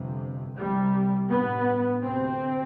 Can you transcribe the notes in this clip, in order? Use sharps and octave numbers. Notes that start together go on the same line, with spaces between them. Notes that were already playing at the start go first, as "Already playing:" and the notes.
Already playing: G1 F2 C3
C2 C3 G3
A1 G2 B3
D2 C3 C4